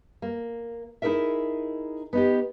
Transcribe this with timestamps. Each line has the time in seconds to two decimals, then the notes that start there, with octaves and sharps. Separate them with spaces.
0.22 A#3
1.02 D#4 E4 G#4 A#4 E5
2.13 B3 D#4 G4